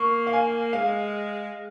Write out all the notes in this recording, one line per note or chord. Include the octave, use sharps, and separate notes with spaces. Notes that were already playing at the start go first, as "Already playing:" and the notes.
Already playing: A#3 C#6
F5
G#5
G#3 F5